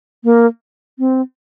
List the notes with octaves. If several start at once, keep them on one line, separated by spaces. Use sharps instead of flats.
A#3
C4